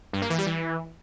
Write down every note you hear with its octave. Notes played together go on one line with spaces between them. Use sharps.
G2
A#3
E3
G3
E3